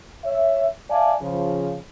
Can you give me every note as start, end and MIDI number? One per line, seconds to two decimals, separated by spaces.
0.25 0.66 73
0.25 0.66 76
0.91 1.13 74
0.91 1.13 76
0.91 1.13 77
0.91 1.13 80
0.91 1.13 81
1.21 1.76 49
1.21 1.76 53